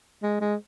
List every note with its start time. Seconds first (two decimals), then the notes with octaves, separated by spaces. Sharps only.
0.23 G#3
0.41 G#3